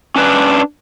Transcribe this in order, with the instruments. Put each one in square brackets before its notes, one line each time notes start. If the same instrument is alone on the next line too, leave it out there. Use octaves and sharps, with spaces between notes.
[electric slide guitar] C#4 D4 B4